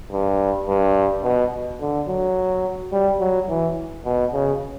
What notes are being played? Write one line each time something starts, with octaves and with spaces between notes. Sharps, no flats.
G2
G2
B2
D3
F#3
G3
F#3
E3
B2
C#3